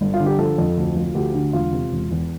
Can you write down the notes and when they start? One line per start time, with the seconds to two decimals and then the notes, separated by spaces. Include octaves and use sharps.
0.01 G1
0.14 F4
0.20 D3
0.26 G4
0.38 F3 A4
0.58 F2
0.77 D2
0.97 F3
1.15 D2 G4
1.34 D3
1.53 E1 F4
1.73 C3
1.92 E1
2.11 E2